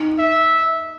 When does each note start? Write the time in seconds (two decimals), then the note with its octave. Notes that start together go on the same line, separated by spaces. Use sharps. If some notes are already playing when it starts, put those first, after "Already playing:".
Already playing: D#4
0.19 E5